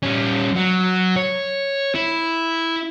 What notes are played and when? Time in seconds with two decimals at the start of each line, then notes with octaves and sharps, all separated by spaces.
0.03 G3 C#4
0.55 F#3
1.16 C#5
1.95 E4